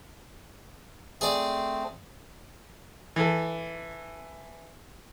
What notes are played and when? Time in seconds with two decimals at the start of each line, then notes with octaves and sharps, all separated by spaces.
1.21 A3 C4 G#4 D5
3.16 E3 A4